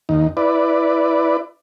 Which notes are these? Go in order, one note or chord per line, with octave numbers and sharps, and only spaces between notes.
D#2 D#4
E4 B4 D5